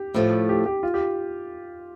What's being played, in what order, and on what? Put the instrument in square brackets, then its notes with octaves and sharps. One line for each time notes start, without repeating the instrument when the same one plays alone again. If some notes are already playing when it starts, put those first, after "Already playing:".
Already playing: [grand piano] G4
[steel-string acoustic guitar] A2 F3 A3
[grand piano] G4
G4
F4
G4